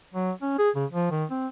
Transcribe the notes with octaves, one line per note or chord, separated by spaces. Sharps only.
F#3
C#4
G#4
C#3
F3
D#3
C4